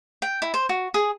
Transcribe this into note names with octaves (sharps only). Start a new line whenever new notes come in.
G5
E4
C5
F#4
G#4